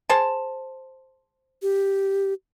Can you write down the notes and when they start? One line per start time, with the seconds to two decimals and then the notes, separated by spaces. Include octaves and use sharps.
0.10 G#4 C5 A5
1.62 G4